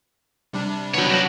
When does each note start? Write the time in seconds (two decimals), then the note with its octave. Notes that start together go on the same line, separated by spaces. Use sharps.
0.53 C3 G3 D4
0.94 F#3 B3 C#5 G5
1.09 C#3 F#4